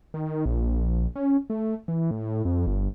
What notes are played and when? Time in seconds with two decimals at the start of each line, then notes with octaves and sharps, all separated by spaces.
0.14 D#3
0.46 A#1
1.16 C#4
1.50 A3
1.88 E3
2.11 A2
2.45 F2
2.67 G1